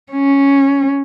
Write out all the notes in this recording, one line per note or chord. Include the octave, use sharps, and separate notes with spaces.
C#4